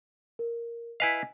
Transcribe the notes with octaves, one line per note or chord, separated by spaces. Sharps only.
A#4
E4 B4 D#5 F5 G#5